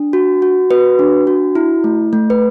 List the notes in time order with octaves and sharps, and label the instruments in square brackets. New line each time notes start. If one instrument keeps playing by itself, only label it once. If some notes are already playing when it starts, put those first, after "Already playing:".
Already playing: [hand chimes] D4
F#4
F#4
F#4 B4
D4
F#4
E4
A3
A3
B4